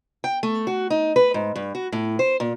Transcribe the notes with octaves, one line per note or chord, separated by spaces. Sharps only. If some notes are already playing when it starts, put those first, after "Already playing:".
G5
A3
F#4
D#4
B4
G#2
G2
F#4
A2
C5
A#2